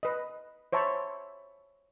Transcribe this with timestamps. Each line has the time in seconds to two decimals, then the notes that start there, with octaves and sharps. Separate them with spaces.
0.03 B4 D#5
0.73 C5 C#5 E5 A5 B5